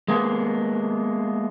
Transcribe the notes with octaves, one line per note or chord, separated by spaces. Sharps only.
G#3 A#3 B3